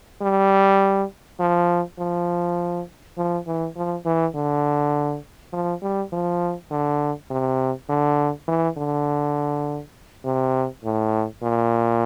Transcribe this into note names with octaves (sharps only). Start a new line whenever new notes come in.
G3
F3
F3
F3
E3
F3
E3
D3
F3
G3
F3
D3
C3
D3
E3
D3
C3
A2
A#2